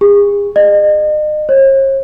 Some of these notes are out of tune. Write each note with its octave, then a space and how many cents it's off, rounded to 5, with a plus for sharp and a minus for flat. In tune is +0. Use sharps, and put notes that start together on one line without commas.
G#4 -40
D#5 -40
C#5 -45